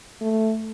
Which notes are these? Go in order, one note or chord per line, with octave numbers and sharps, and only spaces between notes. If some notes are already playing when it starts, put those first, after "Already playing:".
A3